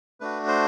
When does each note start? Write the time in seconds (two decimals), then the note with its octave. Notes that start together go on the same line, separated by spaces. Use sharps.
0.20 A3 D4 F#4 B4
0.48 C5